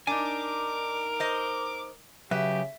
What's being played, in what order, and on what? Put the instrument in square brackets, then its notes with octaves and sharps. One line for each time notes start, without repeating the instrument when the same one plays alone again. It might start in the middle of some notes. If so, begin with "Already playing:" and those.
[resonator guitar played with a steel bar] D4 [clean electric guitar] D#4 G#5 [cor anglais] A#4 [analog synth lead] D6
[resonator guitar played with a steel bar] C5 D#5
[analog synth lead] C#3 [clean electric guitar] F#3 B4 [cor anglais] G4 [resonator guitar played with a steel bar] E5